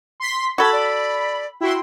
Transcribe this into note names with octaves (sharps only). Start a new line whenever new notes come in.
C6 B6
F#4 A4 B5 G#6
D5
E4 F#4 G5 C6